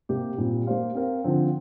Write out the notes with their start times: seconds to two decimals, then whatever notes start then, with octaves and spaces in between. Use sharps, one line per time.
0.09 C3 A#3 G4
0.38 A#2 G3 C4
0.67 A#3 G4 C5 F5
0.95 C4 A#4 F5
1.24 D3 F3 C4